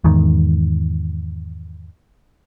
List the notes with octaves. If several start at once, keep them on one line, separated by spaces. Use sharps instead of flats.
E2 G#2 D#3